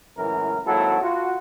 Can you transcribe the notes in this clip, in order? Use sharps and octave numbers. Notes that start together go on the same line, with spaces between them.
C#2 F#2 A2 E3 A#4
G#1 F#3 A#3 E4 F#4 A4
F4 F#4